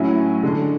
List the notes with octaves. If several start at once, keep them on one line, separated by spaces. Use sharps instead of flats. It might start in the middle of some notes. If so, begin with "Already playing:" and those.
Already playing: A2 F#3 C#4 E4 G#5 B5
D3 G#3 D4